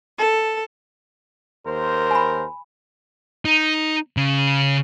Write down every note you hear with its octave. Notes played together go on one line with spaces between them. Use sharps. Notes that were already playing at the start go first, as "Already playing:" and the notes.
A4
D#2 A#4 C5
G#5 B5
D#4
C#3